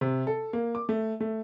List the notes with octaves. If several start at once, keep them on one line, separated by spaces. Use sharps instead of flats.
C3
A4
A#3
D6
A3
A3